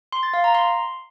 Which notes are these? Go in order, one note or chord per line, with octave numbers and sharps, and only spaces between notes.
C6
A6
F5
A#5
C6